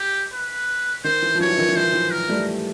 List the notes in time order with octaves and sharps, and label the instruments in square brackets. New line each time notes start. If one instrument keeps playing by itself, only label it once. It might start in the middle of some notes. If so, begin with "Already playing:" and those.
Already playing: [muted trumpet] G4
B4
[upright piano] D#3 [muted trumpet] C5
[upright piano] E3
F3
[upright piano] E3 F#3 [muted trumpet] C#5
[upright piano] E3
D#3 F3
E3
[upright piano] D#3 [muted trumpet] C5
[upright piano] E3
[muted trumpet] A#4
[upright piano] G3 A3